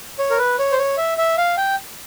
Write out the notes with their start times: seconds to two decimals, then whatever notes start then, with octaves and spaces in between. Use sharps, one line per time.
0.19 C#5
0.30 A#4
0.38 B4
0.59 C#5
0.72 C5
0.78 C#5
0.97 E5
1.18 E5
1.37 F5
1.57 G5